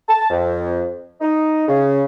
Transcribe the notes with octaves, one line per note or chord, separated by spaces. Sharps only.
A5
F2
D#4
C#3